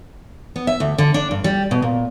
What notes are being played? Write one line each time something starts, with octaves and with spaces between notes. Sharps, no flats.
B3
E5
D2
D3
D4
G2
G3
B2
A#2